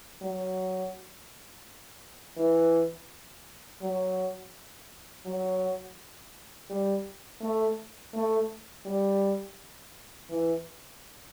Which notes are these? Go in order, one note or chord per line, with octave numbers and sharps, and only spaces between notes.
F#3
E3
F#3
F#3
G3
A3
A3
G3
E3